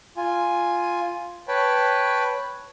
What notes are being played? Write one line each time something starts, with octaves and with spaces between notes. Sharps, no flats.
F4 G#5
B4 C#5 G5 A5 B5